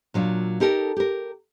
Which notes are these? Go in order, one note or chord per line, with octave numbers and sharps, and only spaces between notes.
A#2 F#3 D4 F4
D#4 G4 A4 A#4
G4 A#4